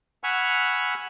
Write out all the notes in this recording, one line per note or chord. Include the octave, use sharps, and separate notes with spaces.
F#5 G#5 B5 C#6 E6 F6